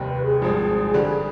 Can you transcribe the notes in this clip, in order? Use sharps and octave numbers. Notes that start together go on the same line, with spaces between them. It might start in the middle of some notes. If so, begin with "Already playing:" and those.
Already playing: F1 D#2 D#3 G3 C4
B4
G#4
G#1 G2 F3 C4
G2 D3 G3 D4